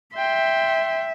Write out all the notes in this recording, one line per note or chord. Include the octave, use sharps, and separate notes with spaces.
E5 G5 C6